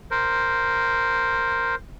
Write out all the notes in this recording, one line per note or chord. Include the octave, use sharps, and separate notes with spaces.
A#4 C5